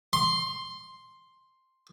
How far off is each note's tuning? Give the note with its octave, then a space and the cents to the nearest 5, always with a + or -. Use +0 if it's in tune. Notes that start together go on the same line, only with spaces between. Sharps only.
C6 +5